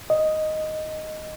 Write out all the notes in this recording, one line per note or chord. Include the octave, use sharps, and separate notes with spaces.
D#5